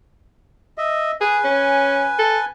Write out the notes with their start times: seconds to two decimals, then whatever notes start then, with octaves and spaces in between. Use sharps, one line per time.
0.78 D#5 E5
1.21 G#4 B4 G#5
1.44 C#4
2.19 A4